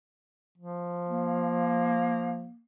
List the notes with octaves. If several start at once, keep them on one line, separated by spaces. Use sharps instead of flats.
F3
A#3